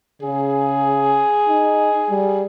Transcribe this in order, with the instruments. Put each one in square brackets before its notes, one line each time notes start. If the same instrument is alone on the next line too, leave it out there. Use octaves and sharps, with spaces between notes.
[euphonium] C#3 [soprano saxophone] G#4
[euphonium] D#4
G3